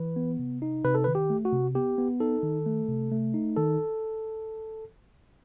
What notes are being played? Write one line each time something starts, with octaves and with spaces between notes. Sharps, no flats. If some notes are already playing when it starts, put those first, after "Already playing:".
Already playing: E3 B4
B3
C3
D#4
C3 B4
A4
B4
D#3
G4
A3
F#4
C3
B3 G4
B3
D#4 A4
D#3
A3
C3
A3
D#4
D#3 A4